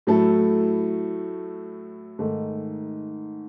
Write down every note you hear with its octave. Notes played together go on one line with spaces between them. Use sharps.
A2 F#3 A3 E4 A4
G#2 D#3 A3